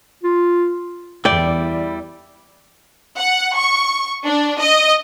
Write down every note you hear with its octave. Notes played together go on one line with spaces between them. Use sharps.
F4
E2 G3 E4 D5 G5
F#5
C#6
D4
D#5